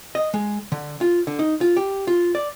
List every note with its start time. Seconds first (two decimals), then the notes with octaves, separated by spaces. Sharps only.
0.15 D#5
0.34 G#3
0.72 D3
1.01 F4
1.27 D3
1.39 D#4
1.61 F4
1.77 G4
2.07 F4
2.35 D5